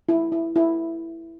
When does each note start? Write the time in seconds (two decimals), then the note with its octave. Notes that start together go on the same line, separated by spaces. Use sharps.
0.09 E4
0.32 E4
0.56 E4